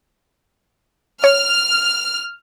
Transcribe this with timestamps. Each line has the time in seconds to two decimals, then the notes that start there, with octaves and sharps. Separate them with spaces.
1.24 C#5 F6